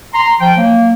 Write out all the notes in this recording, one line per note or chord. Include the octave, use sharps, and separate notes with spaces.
A#5 C6
F3 G5
F#3 A#3